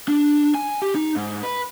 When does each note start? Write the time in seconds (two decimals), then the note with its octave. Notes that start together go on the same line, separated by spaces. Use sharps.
0.08 D4
0.55 G#5
0.82 G4
0.95 D#4
1.16 G#2
1.43 B4